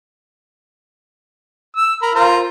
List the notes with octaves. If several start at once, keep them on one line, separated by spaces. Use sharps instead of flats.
E6
A#4 B5
F4 A#4 C5